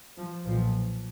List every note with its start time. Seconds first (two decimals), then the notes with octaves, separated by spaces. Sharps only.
0.17 F3
0.45 B1 A#2 F3